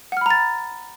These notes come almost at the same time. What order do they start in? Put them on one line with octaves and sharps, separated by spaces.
F#5 F6 B5 A#5 A6